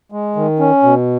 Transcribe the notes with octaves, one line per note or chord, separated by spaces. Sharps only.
G#3
D#3
C#4
B2